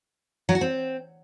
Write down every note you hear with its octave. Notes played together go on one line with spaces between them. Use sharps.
F#3
F#4
C4